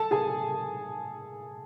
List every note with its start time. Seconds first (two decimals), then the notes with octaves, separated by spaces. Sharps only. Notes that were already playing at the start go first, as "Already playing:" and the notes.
Already playing: A4 A5
0.11 G#4 G#5